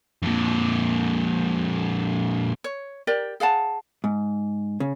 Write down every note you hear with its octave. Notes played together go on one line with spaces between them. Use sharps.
F2 A#2
C#5
G4 A#4 D5
G#4 F5 F#5 A5
G#2
C#3